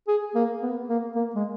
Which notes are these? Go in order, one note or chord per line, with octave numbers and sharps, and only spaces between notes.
G#4
A#3
B3
A#3
A#3
G#3